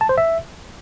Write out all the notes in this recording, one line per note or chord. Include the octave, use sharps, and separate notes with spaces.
A5
C5
E5